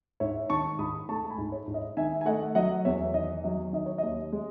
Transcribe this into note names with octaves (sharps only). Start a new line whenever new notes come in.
G#2 C#5 E5
D#3 A5 C#6
G#2 B5 D#6
A3 A5 C#6
A5
G#5 B5
G#2
C#5
G#2
D#5
D#3 E5 G#5
G#5
A3 D#5 F#5
F#3 D#5 F#5
E2 C#5 E5
D#3 D#5
F#3 D#5
D#3 D#5
C#5
D#2 D#5
G#3